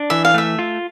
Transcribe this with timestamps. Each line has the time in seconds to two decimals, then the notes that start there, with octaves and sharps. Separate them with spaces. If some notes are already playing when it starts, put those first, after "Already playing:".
Already playing: D4
0.10 E3 E5
0.25 F5
0.34 A3 E5
0.59 F4